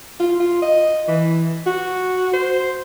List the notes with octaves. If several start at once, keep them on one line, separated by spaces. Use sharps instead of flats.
F4
F4
D#5
E3
F#4
C5